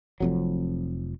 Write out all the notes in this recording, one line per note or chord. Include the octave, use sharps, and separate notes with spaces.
F1 F2 F#3